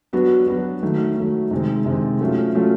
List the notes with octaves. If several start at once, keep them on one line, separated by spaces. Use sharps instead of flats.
F#3 B3 D4 F#4
F#3 B3 D4 F#4
D#3 F#3 A3
D#3 F#3 A3
C3 D#3 G#3 C4
C3 D#3 G#3 C4
F#3 A3 C#4 F4
F#3 A3 C#4 F4